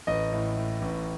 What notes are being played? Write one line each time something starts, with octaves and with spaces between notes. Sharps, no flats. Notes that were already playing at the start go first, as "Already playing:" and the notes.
A1 D#5
A2
A2
A1